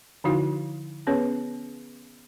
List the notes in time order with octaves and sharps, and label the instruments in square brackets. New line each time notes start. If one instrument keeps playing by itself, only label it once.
[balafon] D3 F3 D#4 E4 F#4 F5
B3 C#4 G#4 B4 C#5